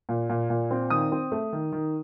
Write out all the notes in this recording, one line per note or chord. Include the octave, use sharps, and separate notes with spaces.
A#2
A#2
A#2
C4
D#3 D#6
C4
A3
D#3
D#3